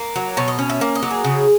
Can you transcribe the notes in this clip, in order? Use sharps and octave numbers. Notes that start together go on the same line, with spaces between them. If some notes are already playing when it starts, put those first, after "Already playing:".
Already playing: A#3
F#3
B2 C#5
D#5
C#4
E5
A#3
D#5
F#3
G#4
C#3